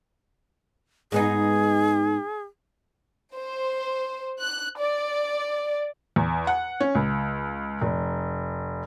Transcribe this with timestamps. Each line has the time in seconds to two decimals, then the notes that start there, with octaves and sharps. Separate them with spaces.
1.12 G#2 B3 D#4 G#4
3.35 C5
4.38 F#6
4.78 D5
6.16 E2
6.47 F#5
6.80 C#4
6.95 C#2
7.81 F1